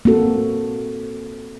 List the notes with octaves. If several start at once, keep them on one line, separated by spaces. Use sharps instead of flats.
A#3 C4 F#4 A4